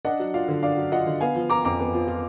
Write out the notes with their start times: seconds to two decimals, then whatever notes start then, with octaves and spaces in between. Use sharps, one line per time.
0.05 D4 D#5 F#5
0.20 F#3
0.34 F4 D5 F5
0.48 D3
0.62 D4 D5 F5
0.77 F#3
0.92 F4 D#5 F#5
1.06 D3
1.20 B3 F5 G#5
1.35 F3
1.50 F4 A#5 D6
1.65 F2 A#5 D6
1.80 B3
1.94 F3
2.08 F4